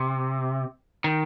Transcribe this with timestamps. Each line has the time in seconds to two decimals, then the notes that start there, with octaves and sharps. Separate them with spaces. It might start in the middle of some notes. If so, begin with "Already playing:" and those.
Already playing: C3
1.04 D#3